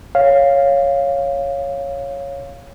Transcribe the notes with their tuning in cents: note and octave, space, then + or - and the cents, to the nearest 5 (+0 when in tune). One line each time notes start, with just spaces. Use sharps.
C#5 +0 F5 +0